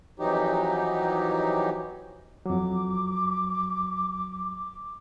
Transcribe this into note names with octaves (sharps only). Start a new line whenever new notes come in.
F2 E3 F#3 D#4 G4
F2 F#3 D6